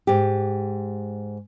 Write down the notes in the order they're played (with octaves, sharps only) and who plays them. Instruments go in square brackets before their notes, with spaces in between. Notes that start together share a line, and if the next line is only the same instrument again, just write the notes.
[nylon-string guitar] G#2 G4